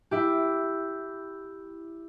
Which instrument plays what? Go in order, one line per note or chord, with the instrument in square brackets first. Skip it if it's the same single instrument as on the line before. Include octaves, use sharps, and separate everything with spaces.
[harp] E4 G4